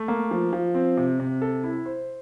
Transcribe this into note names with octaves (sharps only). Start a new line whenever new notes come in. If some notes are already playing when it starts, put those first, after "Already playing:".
Already playing: A3
A#3
F3
F3
C4
C3
C3
A4
E4
C5